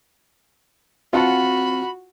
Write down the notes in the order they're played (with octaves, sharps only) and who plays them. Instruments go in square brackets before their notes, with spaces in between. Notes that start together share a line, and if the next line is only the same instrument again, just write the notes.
[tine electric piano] C4 [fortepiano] F4 F#5 A5 [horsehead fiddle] F#4 [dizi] B5